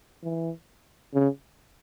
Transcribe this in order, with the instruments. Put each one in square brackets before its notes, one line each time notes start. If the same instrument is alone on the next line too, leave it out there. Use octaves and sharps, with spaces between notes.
[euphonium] E3
C#3